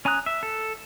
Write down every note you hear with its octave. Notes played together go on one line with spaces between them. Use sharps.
C#4 G#5 A#5 D#6 F#6
E5
A4